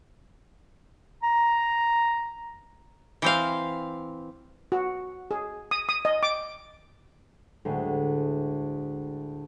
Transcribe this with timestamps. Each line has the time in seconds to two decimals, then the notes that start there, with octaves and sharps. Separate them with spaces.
1.23 A#5
3.22 E3 C4 F5
4.72 F#4
5.31 G#4
5.71 D#6
5.89 D#6
6.05 D#5
6.23 D6
7.65 D2 A2 G#3